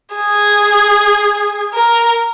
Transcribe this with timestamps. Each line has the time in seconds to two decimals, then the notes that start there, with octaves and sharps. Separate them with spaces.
0.15 G#4
1.74 A#4